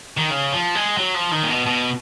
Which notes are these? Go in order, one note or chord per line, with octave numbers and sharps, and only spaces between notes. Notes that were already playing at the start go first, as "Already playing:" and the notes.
D#3
C#3
F3
G#3
F#3
F3
D#3
A#2
B2
B2